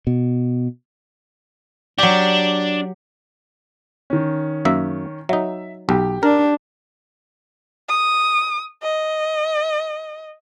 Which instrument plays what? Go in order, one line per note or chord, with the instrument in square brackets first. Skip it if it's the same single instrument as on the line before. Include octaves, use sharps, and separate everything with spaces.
[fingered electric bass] B2
[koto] F#3 G4 [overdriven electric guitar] D4
[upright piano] D#3 C#4
[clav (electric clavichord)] F#2 A#3 E5
[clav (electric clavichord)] F#3 D#4 [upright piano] E5
[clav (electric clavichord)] B1 [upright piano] G4
[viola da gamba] D4 [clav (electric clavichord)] A#4
[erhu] D#6
D#5